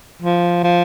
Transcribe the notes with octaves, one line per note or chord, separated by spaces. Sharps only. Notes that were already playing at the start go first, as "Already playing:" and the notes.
F3
F3